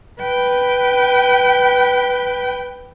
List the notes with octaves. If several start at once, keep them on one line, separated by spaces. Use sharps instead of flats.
B4 G5